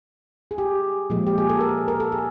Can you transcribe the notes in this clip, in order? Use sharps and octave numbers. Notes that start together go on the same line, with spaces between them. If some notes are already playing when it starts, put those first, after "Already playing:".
G#4
G4
A#2 F3 G#3
G4
G#4
A4
A#4
A#4
A4
G#4